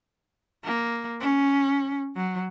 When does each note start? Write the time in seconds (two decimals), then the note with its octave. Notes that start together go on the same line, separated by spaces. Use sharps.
0.65 A#3
1.21 C#4
2.17 F#3